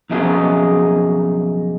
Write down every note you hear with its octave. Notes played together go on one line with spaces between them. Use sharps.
B1 F2 C#3 D#4 G#4